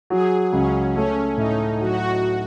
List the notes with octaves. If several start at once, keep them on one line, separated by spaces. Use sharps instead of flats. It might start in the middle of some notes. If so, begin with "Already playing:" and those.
F#3 G#4
C#2 C#4
A3 C#4
A2 D#4
F#3 F#4